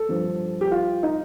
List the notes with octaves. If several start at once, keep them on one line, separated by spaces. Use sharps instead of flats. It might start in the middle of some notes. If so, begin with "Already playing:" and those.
Already playing: A4
G2 F3
G4
F4
D#4